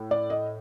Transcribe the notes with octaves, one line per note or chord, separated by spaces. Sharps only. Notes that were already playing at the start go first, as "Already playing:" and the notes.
Already playing: A2
D5
D#5